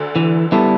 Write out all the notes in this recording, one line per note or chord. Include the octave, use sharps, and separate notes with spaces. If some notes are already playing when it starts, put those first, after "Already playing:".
Already playing: D2 D3
E3
G3 B3 E4 A4